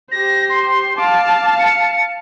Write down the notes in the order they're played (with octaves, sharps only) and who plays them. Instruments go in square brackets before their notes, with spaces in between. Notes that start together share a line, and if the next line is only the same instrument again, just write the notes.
[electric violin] G4 C5 [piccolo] A#6
[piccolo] C6
[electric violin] F5 A5 [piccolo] D6
[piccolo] C#7